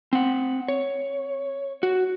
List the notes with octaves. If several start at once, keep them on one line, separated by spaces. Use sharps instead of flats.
C4 F#5
C#5
F#4